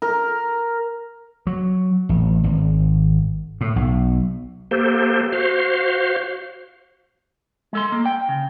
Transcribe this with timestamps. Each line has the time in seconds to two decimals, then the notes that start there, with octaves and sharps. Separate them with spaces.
0.02 A#4
1.47 F#3
2.09 A1
2.43 G#1
3.61 A2
3.76 B1
4.71 A#3 G4 A4 C5
5.32 F#4 C5 F5
7.73 G#3 A4 C6
7.92 A#3
8.06 G5
8.29 C#3